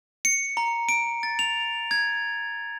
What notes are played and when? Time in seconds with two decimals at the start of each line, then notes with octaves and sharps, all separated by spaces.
0.25 C#7
0.57 A#5
0.89 D7
1.23 A6
1.39 F7
1.91 G#6